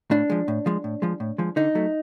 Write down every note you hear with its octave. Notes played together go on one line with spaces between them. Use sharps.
A2 D4
F3 G#3
A2
F3 G#3
A2
F3 G#3
A2
F3 G#3
D3 D#4
F#3 A3